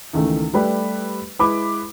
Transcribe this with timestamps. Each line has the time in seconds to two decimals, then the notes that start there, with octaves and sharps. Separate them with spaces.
0.13 C#2 D#3 E3 A3
0.54 G3 A3 D4 G4 B4
1.39 G#3 E4 B4 B5 D6